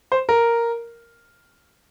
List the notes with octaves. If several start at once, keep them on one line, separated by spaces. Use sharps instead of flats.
C5
A#4